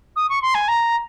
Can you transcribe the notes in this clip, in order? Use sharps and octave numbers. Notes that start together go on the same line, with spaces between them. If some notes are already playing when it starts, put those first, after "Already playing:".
D#6
C#6
C6
G#5
A#5